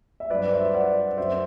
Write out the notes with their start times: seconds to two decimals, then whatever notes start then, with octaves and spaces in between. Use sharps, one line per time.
0.20 E5
0.30 G2 F#3 B4 D5
0.52 C5 E5
0.74 D5 F#5
1.18 F#2 F#3 C5 E5